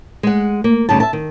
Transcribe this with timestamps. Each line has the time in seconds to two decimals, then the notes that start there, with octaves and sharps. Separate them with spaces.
0.23 G#3 F#5
0.64 A#3
0.89 D2 G2 C#3 D#4 A5
1.00 E5 A5
1.13 D#3